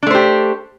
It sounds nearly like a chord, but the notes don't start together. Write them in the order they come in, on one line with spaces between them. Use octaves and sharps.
D4 A3 C5 G4